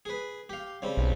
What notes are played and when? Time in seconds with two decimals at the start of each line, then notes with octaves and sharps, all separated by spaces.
0.05 G#4 B4
0.49 G4 F5
0.82 C#3 G3 C4
0.97 B1